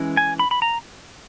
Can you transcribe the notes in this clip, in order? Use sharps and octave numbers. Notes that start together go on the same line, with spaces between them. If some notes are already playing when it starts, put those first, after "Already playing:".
Already playing: E3 G#3 C#4
G#5
B5
B5
A#5